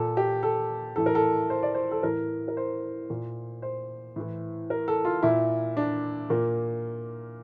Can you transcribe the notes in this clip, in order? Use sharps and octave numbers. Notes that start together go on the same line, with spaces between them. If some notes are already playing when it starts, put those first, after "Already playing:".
Already playing: A#2 A4
G4
A4
A2 E3 A4
A#4
A4
C5
D5
C5
A4
A2 E3 A#4
A#4
C5
A#2
C5
A2 E3
A#4
A4
F4
A#2 E4
D4
A#2 A#3